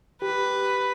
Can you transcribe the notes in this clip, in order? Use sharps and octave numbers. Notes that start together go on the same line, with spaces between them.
G4 B4